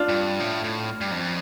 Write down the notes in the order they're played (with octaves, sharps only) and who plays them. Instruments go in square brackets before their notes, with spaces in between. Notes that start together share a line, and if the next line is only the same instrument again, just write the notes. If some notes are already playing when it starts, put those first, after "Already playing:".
Already playing: [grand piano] D4 F4
[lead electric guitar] G2
A2
A2
G2
F2